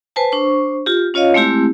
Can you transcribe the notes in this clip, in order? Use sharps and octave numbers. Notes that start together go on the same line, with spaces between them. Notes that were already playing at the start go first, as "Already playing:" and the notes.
B4 C5 G#5 A5
D4 C5 C#6
F4 G4
C#4 F4 C#5 D#5 F5
G#3 A3 C4 E4 G4